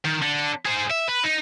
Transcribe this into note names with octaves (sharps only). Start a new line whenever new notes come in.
D#3
D3
G#4 C5
E5
B4
D#4